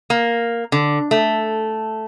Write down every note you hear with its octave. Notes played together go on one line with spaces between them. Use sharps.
A#3
D3
A3